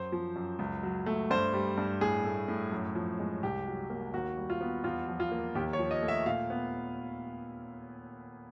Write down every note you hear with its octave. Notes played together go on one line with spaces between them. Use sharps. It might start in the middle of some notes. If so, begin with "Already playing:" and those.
Already playing: F#2 C5
F3
F#2
C#2
F#3
A3
G2 C5
G3
G2
A2 G#4
A3
A2
F#2
F3
G#3
C2 G4
F#3
A#3
D#2 F#4
G3
F4
B3
E2 F4
F3
F4
A#3
D#2 G4
C#5
F3
D#5
A3
E5
A#2 F5
B3